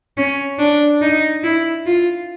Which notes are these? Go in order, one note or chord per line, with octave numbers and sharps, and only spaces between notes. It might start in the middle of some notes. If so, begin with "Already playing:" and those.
C#4
D4
D#4
E4
F4